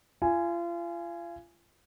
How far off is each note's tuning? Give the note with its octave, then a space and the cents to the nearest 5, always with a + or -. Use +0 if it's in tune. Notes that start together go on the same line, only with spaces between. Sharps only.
F4 -35 G#5 +0